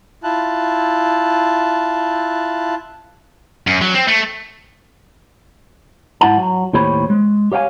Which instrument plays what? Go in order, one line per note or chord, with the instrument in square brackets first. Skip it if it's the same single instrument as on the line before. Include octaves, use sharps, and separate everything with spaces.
[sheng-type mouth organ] E4 F4 A5 F#6
[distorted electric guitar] F#2
F#3
C4
A3
[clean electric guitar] G#2 E4 F#5 A5
F#3
D#2 A2 G4 C5 C#5 B5
G#3
G4 C#5 F5 G5 G#5